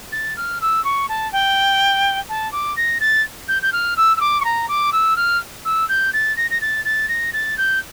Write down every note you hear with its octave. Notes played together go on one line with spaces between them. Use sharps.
A6
F6
E6
C#6
A5
G5
A5
D6
A#6
A6
G6
G6
F6
E6
E6
D6
C#6
A#5
D6
E6
F6
E6
G6
A6
A#6
A#6
A6
A6
A#6
A6
G6